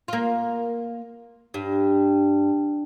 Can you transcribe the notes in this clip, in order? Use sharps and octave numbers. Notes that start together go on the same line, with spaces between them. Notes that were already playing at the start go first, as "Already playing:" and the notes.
A#3 F4
G2